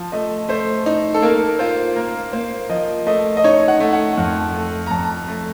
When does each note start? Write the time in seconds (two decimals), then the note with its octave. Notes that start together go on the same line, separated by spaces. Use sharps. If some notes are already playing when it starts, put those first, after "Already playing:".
Already playing: F3 A5
0.12 A3 D#5
0.49 A3 C5
0.86 D#4
1.14 A4
1.22 A#3 A#4
1.59 F4 C5
1.96 A#3 A#4
2.33 A#3 C5
2.70 F3 D#5
3.07 A3 D#5
3.37 D#5
3.44 D#4 C#5
3.68 F#5
3.80 A3
3.93 F#5
4.18 F2
4.54 A3
4.87 A#5
4.90 F2 A5
5.28 A3